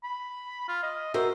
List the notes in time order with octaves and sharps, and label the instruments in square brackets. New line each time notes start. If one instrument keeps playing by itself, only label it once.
[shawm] B5
F4
D#5
[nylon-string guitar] F#4 A#4 C5 [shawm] E5